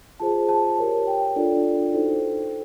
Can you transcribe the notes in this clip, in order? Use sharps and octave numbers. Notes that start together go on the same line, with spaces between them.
F4 G#4 C5 A5
A5
G4 A#4 C#5
G5
D4 F4 A4 D5
D#4 F#4 A4 C5